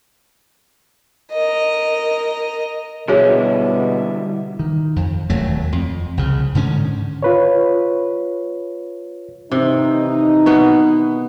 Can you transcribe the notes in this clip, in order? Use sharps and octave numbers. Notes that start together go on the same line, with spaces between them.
A#4 D#5
B2 D3 G3 E4 F#4 G#4 C#5
D#3
F2
E1 D#2 F#3 A3
F2
C2 C#3
G#2 D3 D#3 C#4
F4 B4 C#5
C3 D#3 E3 D#4
B2 B3